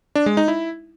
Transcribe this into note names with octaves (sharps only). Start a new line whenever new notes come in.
D4
G#3
D#4
E4